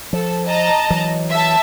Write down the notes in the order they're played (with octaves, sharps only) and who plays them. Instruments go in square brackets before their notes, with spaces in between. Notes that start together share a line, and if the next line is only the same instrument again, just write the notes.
[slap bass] F3 [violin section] A4
[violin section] D#5 A5 A#5
[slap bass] E3 F#3
[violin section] E5 A5